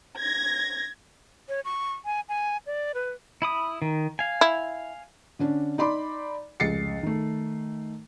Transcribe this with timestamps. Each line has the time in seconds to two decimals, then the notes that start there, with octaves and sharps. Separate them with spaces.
0.17 G#6 A#6
1.49 C#5
1.65 C#6
2.05 G#5
2.29 G#5
2.66 D5
2.94 B4
3.42 E4 B5 D#6
3.82 D#3
4.19 F5 G#5
4.41 E4
5.39 D3 C#4 D4
5.78 D#4 D5 B5 C6 D6
6.60 F1 C#2 A6 C7 C#7
7.03 D#3 A3